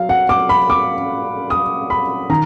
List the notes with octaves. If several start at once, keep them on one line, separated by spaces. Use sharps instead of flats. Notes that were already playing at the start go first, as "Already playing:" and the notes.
Already playing: F#3 F5
F#5
D6
B5
D6
D#6
B5
D#3 A#5